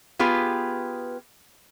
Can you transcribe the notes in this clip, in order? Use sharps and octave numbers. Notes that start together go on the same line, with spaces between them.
B3 F4 G4 G#4 B4